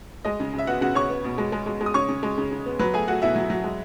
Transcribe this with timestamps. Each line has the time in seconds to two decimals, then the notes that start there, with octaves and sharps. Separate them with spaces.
0.25 G#3 D#5
0.40 C#3
0.54 C#3 E5
0.67 B3 F#4 F#5
0.81 C#3 F#4 F#5
0.95 C#3 C#5 C#6
1.09 B3
1.24 B2
1.38 G#3
1.52 G#3
1.66 G#3
1.81 G#3
1.86 D#6
1.94 C#3 C#5 C#6
2.09 C#3
2.23 G#3
2.38 C#3
2.51 C#3
2.66 B3
2.79 F#3 B4 B5
2.93 A3 G#4 G#5
3.08 A3 F#4 F#5
3.22 B2 E4 E5
3.36 F#3
3.50 F#3
3.64 G#3